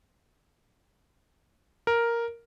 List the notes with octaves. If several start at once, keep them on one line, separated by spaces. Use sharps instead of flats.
A#4